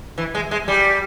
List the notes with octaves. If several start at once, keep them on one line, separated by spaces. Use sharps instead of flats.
E3
G#3
G#3
G3